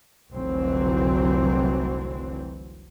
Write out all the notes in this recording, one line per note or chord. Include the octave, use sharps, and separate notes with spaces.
F1 C2 D3 E3 F#3 C4